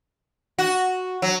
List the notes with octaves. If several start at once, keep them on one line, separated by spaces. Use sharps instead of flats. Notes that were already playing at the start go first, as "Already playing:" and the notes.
F#4
F#3